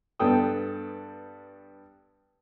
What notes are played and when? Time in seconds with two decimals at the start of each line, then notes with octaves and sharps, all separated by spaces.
0.19 G2 B3 A4 G5 D#6